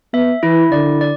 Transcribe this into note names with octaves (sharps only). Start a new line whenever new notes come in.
B3 E5
E3 E4
D3 D5
D5